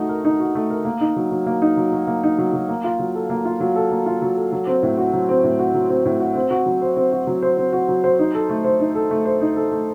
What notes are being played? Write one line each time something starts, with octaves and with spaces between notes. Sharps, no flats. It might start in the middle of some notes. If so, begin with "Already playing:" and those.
Already playing: A3 D#4 F#4
A#4
D#4
F#4
A3
A#4
A#3
D#4
F#3
F#3
A#3
D#4
F#3
F#3
A#3
D#4
F#3
F#3
A#3
F4
F#3
A4
A#3
F4
F#3
A4
A#3
F4
F#3
A4
F#3
C4
A2
F#4
F#3
C4
A2
F#4
F#3
C4
A2
F#4
C4
F#4
F#3
C5
C4
F#4
F#3
C5
C4
F#4
F#3
C5
D#4
A4
A3
C5
D#4
A4
A3
C5
D#4
A4
A3